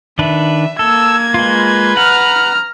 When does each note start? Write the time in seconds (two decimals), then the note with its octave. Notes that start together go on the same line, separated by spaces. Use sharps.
0.19 D#3 D4 B4 E5
0.79 A#3 A4 E6 G#6
1.34 G#3 F4 B4
1.97 F#5 A#5 F6